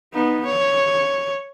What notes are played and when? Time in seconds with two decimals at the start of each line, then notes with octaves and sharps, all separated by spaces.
0.13 B3 D#4
0.46 C#5